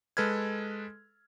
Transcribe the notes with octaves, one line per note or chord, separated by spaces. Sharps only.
G#3 A4 B4 F6 G#6